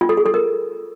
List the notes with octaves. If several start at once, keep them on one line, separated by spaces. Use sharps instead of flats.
F4
A4
G#4
A4
A#4